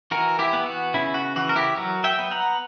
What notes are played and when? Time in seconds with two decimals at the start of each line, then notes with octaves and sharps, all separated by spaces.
0.11 E3 F#4 A#4
0.39 E4 G4
0.53 B3
0.66 F#4
0.94 C#3 E4
1.14 F#4
1.36 E3 F#4
1.49 A#4
1.56 E4 G4
1.76 F#3 F#4 A#4
2.04 E5 G5
2.19 B3
2.31 F#5 A#5